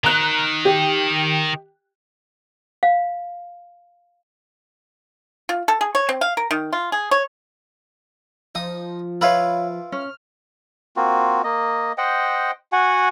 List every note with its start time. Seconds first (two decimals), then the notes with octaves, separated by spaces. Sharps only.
0.04 D#3 A#5 F#6
0.65 G4
2.83 F5
5.49 F4
5.68 A4
5.81 G#4
5.95 C#5
6.09 C4
6.21 F5
6.37 A#4
6.51 D#3
6.73 F4
6.92 G#4
7.11 C#5
8.55 F3 D#4 D#6
9.21 E4 F4 B4 C#5 F5 B5
9.92 C#4 F6
10.96 A#3 C4 F4 F#4
11.44 A#3 D#5
11.98 C5 D#5 F#5 G5
12.72 F#4 F#5 G#5